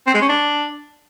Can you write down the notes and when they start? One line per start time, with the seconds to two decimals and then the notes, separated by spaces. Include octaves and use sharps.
0.07 C4
0.14 G#3
0.22 C#4
0.29 D4